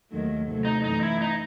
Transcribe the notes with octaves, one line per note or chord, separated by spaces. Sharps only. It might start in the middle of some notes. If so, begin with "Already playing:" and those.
D#2 D#3 F#3 A3
C3 F#3 A3
D#4
F#2 E3 A3 D#4
E4
D#4